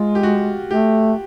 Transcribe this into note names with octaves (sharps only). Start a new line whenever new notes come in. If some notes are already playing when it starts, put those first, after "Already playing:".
Already playing: G#3 F4
G4
F#4
A3 G4